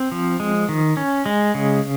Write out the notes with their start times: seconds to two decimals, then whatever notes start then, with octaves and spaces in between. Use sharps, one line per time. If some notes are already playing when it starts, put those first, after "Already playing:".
Already playing: C4
0.12 F3
0.40 G#3
0.69 D#3
0.97 C#4
1.26 G#3
1.55 C#3